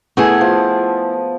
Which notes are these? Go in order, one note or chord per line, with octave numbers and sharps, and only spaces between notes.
A3 B3 E4 G#4
F3